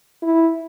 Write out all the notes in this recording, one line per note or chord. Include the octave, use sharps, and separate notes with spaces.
E4